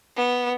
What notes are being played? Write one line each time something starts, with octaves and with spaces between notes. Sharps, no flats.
B3